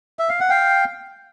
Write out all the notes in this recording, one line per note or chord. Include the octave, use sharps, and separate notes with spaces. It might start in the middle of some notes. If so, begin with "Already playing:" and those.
E5
F5
F#5
F5 G5